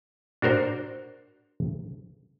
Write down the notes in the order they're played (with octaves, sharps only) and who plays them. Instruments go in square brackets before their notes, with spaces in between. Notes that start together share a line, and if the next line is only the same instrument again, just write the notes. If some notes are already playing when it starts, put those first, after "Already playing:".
[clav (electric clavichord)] D4 F#4 A#4 C5